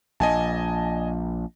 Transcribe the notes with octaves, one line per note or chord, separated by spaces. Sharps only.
A#1 D#5 G#5 A5